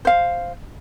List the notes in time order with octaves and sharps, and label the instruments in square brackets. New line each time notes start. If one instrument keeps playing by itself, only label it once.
[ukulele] C5 F5